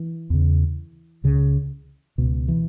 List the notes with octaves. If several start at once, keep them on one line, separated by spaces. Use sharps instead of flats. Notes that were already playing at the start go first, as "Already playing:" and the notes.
Already playing: E3
E2 C#3
C#2 C#3
C#2 B2
E3